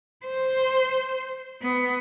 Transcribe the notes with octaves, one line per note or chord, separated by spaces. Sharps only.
C5
B3